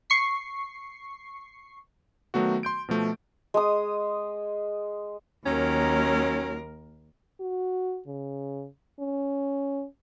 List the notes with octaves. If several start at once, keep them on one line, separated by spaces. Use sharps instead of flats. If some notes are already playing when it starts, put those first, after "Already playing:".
C#6 C7
D#3 F#3 A3 B3 F#4
C6 G6 D7
B2 F3 A3
G#3 D#6
D#2 D#3 F#3 C#4 A#4
F#4
C#3
C#4